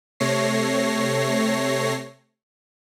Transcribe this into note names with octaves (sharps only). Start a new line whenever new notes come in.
C3 A3 C#5 A#6 C7